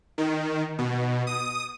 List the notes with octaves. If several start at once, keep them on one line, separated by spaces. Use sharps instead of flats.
D#3
B2
D#6